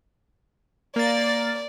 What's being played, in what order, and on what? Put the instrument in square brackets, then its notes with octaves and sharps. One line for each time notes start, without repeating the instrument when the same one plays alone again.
[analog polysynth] A#3 A6 [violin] D5